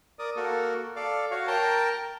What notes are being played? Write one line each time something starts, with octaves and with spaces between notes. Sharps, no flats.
A#4 D5 D#6
A#3 F#4 A4 A#4
A4 D5 F5
F#4 C#5 F5
A#4 G5 A5 A#5